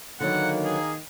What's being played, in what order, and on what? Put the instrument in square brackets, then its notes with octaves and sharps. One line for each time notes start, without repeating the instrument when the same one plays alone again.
[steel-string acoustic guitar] D3 F#3 B3 [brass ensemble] D#3 A#3 [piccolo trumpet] F#5
[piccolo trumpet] G#4